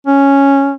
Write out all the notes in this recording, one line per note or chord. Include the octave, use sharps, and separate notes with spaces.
C#4